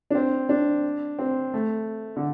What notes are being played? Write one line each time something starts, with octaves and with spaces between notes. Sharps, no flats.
D4
C4
D4
C4
A3
D3